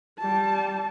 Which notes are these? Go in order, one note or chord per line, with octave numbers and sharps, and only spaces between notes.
G3 A5